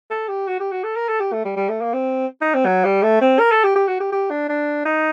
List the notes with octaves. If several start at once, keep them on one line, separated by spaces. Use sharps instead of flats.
A4
G4
F#4
G4
F#4
A4
A#4
A4
G4
A3
G3
G3
A3
A#3
C4
D#4
C4
F#3
G3
A3
C4
A#4
A4
G4
G4
F#4
G4
G4
D4
D4
D#4